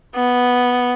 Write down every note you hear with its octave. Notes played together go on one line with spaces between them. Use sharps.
B3